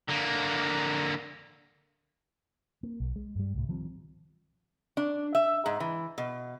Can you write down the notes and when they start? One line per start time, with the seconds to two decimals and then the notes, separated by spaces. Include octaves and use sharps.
0.09 D3 A#3
2.83 A#3
3.00 B1
3.16 G#3
3.35 G2 G3
3.54 C2 A2
3.69 D#3 F3 G3 C4
4.97 D4
5.35 E5
5.66 G#2
5.80 E3
6.18 B2